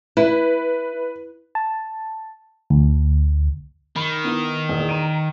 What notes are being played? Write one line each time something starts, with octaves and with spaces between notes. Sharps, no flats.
E4 B4
A5
D2
D#3 B5 C7
B3 E4
E2 A#2
A#5 D7 D#7